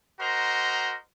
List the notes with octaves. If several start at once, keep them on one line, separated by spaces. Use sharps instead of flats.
F#4 A#4 C5 D#5 A#5 C6